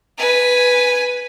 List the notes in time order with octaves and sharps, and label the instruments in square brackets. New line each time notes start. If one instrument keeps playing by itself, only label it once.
[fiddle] B4 G#5